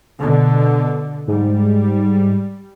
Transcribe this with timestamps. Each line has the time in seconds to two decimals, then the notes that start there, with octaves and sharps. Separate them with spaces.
0.19 B2 D3
1.28 G#2 G3